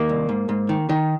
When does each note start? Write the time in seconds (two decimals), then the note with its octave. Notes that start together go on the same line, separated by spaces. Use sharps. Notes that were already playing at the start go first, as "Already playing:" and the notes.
Already playing: D#3 A#3
0.09 C2
0.29 G#2
0.49 G#2
0.69 D#3
0.89 D#3